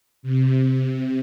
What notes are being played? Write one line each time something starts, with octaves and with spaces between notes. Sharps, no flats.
C3